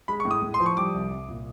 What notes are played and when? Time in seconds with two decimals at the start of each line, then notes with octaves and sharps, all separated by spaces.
0.08 G#3 B5
0.20 C#6
0.25 A2
0.31 D#6
0.42 A2
0.54 C6
0.60 F3
0.66 C#6
0.77 G3 D6
0.94 C2
1.11 C2
1.28 A#2